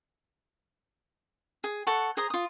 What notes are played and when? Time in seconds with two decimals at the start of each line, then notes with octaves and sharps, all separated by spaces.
1.64 G#4
1.87 A4 F#5 C#6
2.17 G#4 C5 A#5 D#6
2.30 F4 D#6